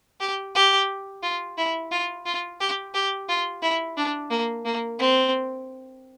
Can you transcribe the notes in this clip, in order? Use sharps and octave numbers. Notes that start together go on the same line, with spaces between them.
G4
G4
F4
E4
F4
F4
G4
G4
F4
E4
D4
A#3
A#3
C4